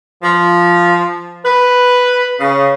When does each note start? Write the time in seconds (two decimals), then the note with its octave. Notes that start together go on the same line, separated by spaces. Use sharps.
0.23 F3
1.45 B4
2.40 C#3